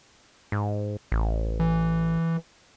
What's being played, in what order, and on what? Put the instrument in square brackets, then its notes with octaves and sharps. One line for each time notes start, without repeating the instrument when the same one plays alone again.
[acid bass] G#2
A1
[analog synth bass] E3